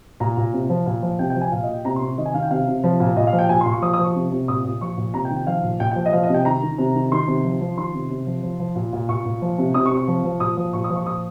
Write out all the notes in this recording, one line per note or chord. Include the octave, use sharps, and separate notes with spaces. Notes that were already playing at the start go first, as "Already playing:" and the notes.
A#2 A#5
A#2
C3
F3
A#2
F3
C3 G5
G5
F3
G#5
A#2 F5
D#5
A#2
G5
C3 A#5
C3 C6
C#6
D#3 D#5
G#5
D#3 F5
G5
C3 F5
C3
F3
A#2
A#2 D#5
F5
F3
G5
A#2 G#5
C6
A#2
C#6
F3 D#6
D#6
F3
C#6
C3
C3
A#2 D#6
A#2
F3 C#6
A#2
C3 A#5
G5
D#3
G5
F3 F5
A#2
A#2 G5
F3 G5
D#5
F3 F5
D#5
C3
G5
D#3 A#5
D#3
C3
D#3
D#3 C6
C3
F3
F3
D#3 C6
C3
C3
F3
F3
F3
A#2
A#2
A#2 C#6
A#2
F3
C3
C3 D#6
C#6
C3
C#6
F3
F3
A#2 D#6
F3
A#2 C#6
D#6
F3
C#6
A#2 D#6